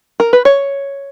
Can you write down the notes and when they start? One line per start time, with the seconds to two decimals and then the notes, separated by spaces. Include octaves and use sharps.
0.20 A#4
0.33 B4
0.45 C#5